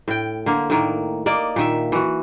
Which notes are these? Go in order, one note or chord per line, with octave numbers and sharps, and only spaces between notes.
A2 G5
D3 A#3
A2 D#3 A#3
A#3 D5 D#5
A#2 D#3 E5
E3 F#4